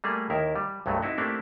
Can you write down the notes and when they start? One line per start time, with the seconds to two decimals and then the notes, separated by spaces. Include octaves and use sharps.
0.04 G3 A3 A#3 G#4
0.30 D#2 D#3 E4 A#4
0.56 G3
0.86 C2 G2 F#3 G#3 A3
1.02 C4 D#4 E4 F#4
1.18 A3 A#3 C4 D4 E4 G4